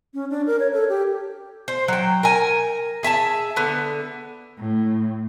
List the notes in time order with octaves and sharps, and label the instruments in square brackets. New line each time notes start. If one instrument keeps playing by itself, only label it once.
[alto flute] C#4
D4
A#4
C#5
A4
G4
[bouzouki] C5
F#3 G5
A#4 G#5
G#4 E5 G#5 A5
D3 B3
[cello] A2